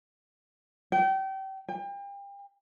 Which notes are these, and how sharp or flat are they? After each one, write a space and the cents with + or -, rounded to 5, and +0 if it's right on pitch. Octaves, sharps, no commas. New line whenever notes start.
G5 -30
G5 +35